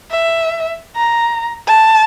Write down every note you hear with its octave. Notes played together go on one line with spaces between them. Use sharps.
E5
A#5
A5